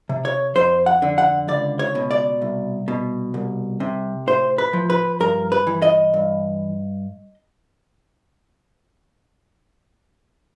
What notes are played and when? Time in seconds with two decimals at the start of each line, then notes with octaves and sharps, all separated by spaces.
0.09 C3
0.25 C#5
0.55 F2 C5
0.86 F#5
1.02 D3
1.18 F#5
1.48 C#2 D5
1.79 C#5
1.95 B2
2.11 D5
2.41 C2
2.88 B2
3.34 C2
3.80 C3
4.27 A2 C5
4.58 B4
4.73 F3
4.90 B4
5.20 G2 A#4
5.52 B4
5.67 E3
5.82 D#5
6.14 G2